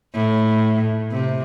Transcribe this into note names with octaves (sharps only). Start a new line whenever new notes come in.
A2
C3